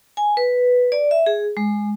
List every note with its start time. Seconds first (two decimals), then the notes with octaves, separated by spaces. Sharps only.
0.17 G#5
0.37 B4
0.92 D5
1.11 E5
1.27 G#4
1.57 G#3